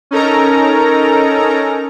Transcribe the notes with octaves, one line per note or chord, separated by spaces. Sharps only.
C#4 D#4 A4 A#4 A#5